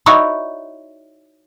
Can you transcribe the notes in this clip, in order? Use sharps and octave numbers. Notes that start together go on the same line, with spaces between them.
D#4 E4 F#4 C#5 D5